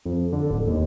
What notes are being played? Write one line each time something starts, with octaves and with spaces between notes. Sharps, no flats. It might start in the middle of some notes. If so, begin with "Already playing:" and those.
F2
D3
D1
D#2